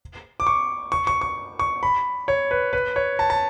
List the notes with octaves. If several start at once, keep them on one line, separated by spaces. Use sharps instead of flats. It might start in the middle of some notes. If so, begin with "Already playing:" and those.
D6
C#6
C#6
C#6
C#6
C#6
B5
C#5
B4
B4
C#5
A5
A5